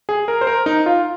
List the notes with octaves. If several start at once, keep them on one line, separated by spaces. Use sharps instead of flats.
G#4
A#4
C5
A#4
D#4
F4